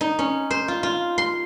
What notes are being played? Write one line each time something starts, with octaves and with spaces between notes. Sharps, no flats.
D#4
C#4
C5
F4
F4
C6